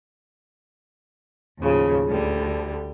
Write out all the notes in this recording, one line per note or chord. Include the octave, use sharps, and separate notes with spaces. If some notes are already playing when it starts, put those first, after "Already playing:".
D#2 A2 C#3 F3
D2 D3 G3